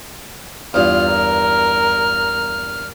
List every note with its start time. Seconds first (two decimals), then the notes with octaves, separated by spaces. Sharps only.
0.74 E2 G2 F4 F6
1.11 A#4